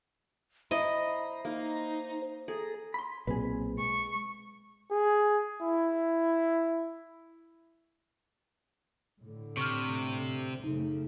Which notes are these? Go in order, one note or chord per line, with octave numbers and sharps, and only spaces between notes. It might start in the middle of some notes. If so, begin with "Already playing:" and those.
E4 C5 D#5 A#5 B5
A#3 D#4
G#4 A4 A#5
B5 C6
B1 A#2 C4 G#4 B4
G#3 C#6
G#4
E4
A2 D3
C3 C#6 F6
F#2 C#3 A3 D#4